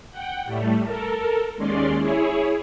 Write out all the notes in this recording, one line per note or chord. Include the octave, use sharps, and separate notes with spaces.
F#5 G5
A2 G3 A3
A4 A#4
D#2 G#3 C#4 D5 C6
E4 G#4 C#5